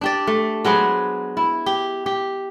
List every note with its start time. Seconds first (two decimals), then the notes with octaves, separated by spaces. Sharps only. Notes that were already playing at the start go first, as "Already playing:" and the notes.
0.01 D4 G4 D5
0.27 A3
0.65 F#3 G#3 B3 C5
1.37 E4
1.66 G4
2.06 G4